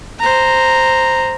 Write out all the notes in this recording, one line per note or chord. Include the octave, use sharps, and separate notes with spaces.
C5 A#5